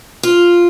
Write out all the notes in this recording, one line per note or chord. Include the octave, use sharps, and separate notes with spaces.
F4